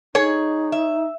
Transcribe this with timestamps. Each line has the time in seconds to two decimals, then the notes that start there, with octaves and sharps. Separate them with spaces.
0.15 D#4 G#4 C#5
0.72 E5